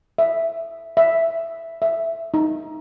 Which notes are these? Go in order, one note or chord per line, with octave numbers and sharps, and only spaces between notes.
E5
E5
E5
D#4